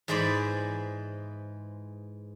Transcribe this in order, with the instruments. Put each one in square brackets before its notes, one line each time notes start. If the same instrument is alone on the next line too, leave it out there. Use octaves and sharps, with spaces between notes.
[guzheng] G#2 E3 G#3 C5 D5 B5